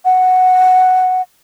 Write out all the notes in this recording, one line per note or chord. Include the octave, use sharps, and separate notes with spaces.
F#5